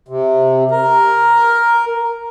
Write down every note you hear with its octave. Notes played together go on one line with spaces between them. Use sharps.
C3
A#4